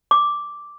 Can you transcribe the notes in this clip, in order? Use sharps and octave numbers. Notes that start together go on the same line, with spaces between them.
D6